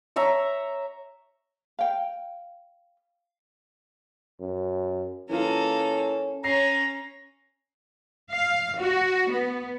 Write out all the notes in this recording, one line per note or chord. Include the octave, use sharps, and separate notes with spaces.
C#5 E5 A#5
F5 G5
F#2
E3 A#3 C#4 F4 A4
C#4 C#5 A#5 C7
F5
F#4
B3